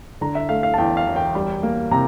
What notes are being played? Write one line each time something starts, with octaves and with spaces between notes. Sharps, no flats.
D3 A#5
E5
A3 F5
F5
A5
E2 G5
F5
E1
G5
G3
A#3
C3 A#5